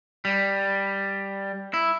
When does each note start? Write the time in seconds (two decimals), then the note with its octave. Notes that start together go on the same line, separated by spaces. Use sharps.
0.25 G3
1.74 E4